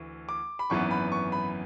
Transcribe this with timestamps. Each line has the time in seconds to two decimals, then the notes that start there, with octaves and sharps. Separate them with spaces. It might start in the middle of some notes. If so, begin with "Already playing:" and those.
Already playing: D2 E3
0.29 D6
0.59 B5
0.70 G#1 F#2 E3 B3 C#6
0.91 B5
1.12 C#6
1.32 B5